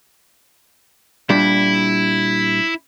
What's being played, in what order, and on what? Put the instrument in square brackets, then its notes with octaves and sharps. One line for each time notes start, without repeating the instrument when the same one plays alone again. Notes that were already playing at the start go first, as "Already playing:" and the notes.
[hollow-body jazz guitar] A#2 G3 D4 [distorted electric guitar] E4